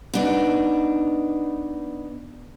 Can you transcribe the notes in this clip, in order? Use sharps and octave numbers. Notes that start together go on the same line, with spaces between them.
B3 D4 D#4